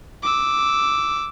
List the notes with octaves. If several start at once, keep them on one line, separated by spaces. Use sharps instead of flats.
D6 E6